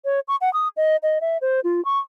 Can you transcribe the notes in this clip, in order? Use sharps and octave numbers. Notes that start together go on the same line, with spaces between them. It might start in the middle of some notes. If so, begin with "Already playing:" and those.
C#5
C#6
F#5
D#6
D#5
D#5
E5
C5
F4
C#6